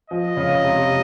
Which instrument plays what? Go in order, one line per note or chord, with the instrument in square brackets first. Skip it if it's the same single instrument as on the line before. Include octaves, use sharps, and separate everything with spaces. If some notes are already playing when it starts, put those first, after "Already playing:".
[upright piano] F3 [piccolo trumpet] D#5
[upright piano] C#3
C3